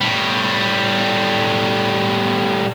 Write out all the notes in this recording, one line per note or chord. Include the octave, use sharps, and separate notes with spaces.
A2 G3